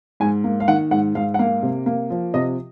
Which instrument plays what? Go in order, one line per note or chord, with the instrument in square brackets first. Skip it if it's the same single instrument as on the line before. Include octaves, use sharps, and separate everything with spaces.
[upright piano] G#2 G#5
A#3
F5
D#3 F#5
G#2 F#5
G#2 F5
F#5
A#3 F5
C3
A#3
F3
C3 D#5